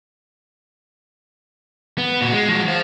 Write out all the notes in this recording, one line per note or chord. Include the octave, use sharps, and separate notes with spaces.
B3
A#2 F#4
G#3
F3 F#4
C5 F5